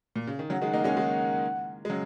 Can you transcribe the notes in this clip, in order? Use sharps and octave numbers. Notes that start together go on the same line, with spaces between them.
A#2
C#3
D#3
C#3 F#3 F#5
D#3 G#3
A#3 D#4
G#3 C#4
D#3 G#3
G#3
C#3 F#3